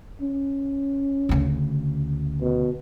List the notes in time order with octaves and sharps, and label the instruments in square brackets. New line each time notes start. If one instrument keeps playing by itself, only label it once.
[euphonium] C#4
[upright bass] D2 C#3
[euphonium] B2